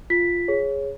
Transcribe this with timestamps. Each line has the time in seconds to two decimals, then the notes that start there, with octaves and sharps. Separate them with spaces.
0.10 F4 B6
0.48 G#4 C#5